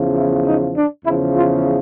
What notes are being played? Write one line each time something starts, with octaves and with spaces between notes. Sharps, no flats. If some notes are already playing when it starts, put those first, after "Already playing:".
Already playing: E2 C#3 F3
E4
D#4
D4
E2 C#3 F3 E4
F4